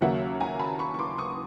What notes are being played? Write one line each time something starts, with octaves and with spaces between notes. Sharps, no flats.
D#2 C#3 F#3 A#3 E5 F#5
G#5 A#5
A5 B5
B5 C#6
C#6
C6 D6
C#6 D#6